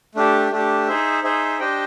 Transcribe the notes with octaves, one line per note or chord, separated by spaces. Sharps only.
A3 D4 G4
A3 D4 G4
D#4 G#4 C5 E5
D#4 G#4 C5 E5
D4 G4 C5 D#5 G5